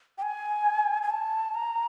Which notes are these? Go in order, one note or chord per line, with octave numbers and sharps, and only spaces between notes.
G5
G#5
G#5
A5
A#5